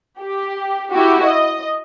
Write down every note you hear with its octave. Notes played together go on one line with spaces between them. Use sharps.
G4
E4 F#4 G4
D#5